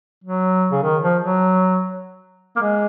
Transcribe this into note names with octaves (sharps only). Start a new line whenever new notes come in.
F#3
C#3
D#3
F3
F#3
A#3
G#3